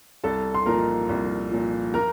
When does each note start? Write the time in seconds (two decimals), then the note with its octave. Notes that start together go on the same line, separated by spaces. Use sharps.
0.24 C2 A4 A5
0.54 C6
0.66 A#2 F3 A#4 A#5
1.09 C2
1.52 A#2 F3
1.94 A#4 A#5